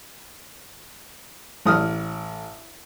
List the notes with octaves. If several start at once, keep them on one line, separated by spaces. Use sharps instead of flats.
A1 D#6 F6